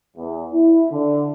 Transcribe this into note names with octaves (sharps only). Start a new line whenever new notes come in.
E2
E4
D3